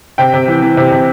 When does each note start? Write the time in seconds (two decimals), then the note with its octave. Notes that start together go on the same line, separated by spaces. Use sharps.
0.18 C3 G5
0.34 C3
0.48 E3
0.62 E3
0.77 C3
0.91 C3